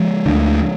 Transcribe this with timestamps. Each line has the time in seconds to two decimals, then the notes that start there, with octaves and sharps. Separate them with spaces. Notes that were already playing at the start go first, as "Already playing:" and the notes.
Already playing: F3 G#3
0.26 D2 D3